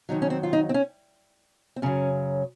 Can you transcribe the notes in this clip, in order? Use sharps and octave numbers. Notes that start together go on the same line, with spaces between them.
F2 D#3 F#3 D#4
C#4
C4
F4
D#4
C4
C#4
C4
F#2 C#3 F#3 C#4